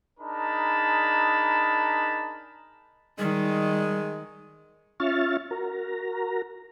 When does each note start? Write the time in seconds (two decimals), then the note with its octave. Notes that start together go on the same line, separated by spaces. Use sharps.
0.20 D4 D#4 G#4 A#4 A5 B5
3.19 D#3 G3 G#3
5.00 C#4 F4 E5 C#6 F6 A6
5.51 F#4 A#4 A#5